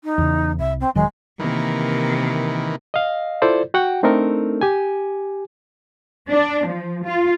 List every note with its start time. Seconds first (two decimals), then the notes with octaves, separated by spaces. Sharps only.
0.04 D#4
0.18 E2 C#3
0.59 C2 E5
0.81 C4
0.95 E1 D#3 F#3 G#3
1.40 C3 D#3 E3 A#3
2.94 D#5 F5
3.42 E4 F4 A4 C5 D5
3.74 F#4 F#5 G5
4.03 A3 C4 D4 D#4 A4 A#4
4.61 G4 G#5
6.29 D4
6.67 F3
7.06 F4